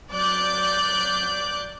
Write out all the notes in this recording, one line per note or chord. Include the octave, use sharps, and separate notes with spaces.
F#3 D5 D6 F#6 G6